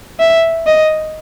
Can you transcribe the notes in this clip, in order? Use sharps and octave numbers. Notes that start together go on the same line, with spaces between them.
E5
D#5